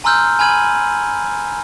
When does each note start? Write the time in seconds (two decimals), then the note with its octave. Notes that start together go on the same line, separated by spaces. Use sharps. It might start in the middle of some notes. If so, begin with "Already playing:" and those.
0.04 G#5 A#5 C6 E6 F6 G6
0.39 G#5 B5 F6 G#6 D#7 F#7